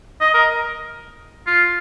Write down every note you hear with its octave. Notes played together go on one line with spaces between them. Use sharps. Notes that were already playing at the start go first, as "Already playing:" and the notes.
D#5
A#4
F4